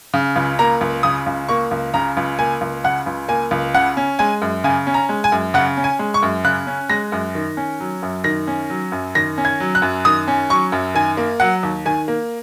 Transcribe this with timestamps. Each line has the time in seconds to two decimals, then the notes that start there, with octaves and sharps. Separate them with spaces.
0.14 C#3
0.36 C#2
0.59 A#3 A#5
0.81 C#2
1.03 C#3 D#6
1.26 C#2
1.49 A#3 C#6
1.71 C#2
1.94 C#3 A#5
2.17 C#2
2.39 A#3 G#5
2.61 C#2
2.84 C#3 F#5
3.06 C#2
3.28 A#3 G#5
3.51 C#2
3.74 C#3 F#5
3.97 C#4
4.19 G#3 G#5
4.42 F#2
4.64 C#3 G#5
4.87 C#4
4.94 A#5
5.09 G#3
5.24 G#5
5.32 F#2
5.54 C#3 F#5
5.77 C#4
5.84 G#5
5.99 G#3
6.14 C#6
6.23 F#2
6.44 C#3 F#6
6.67 C#4
6.90 G#3 A#6
7.12 F#2
7.35 D#3
7.57 C#4
7.80 F#3
8.03 F#2
8.24 D#3 A#6
8.47 C#4
8.70 F#3
8.92 F#2
9.15 D#3 A#6
9.38 C#4
9.45 G#6
9.60 F#3
9.75 F#6
9.82 F#2
10.05 D#3 D#6
10.28 C#4
10.50 F#3 C#6
10.72 F#2
10.95 D#3 G#5
11.17 A#3
11.40 F#3 F#5
11.63 D#2
11.86 D#3 G#5
12.08 A#3